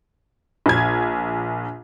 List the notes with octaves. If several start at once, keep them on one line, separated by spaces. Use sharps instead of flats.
A#1 G#6